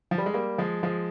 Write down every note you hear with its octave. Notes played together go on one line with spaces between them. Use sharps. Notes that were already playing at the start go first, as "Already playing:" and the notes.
F3
G3
G#3
G3 A#3
F3 G#3
F3 G#3